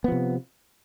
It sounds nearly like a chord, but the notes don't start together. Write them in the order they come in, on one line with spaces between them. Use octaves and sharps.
B3 F3 C3